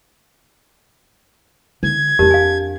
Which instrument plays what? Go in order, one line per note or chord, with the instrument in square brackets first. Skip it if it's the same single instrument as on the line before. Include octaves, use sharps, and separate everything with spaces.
[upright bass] D3 [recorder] G#6
[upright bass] F2 D4 [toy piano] G4 A#4 A5
[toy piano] F5 G#5